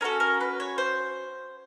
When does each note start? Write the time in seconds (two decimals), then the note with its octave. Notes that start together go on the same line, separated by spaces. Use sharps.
0.01 C#4 F#4 A4 A#4
0.20 A#4
0.41 B4
0.60 C#5
0.78 C5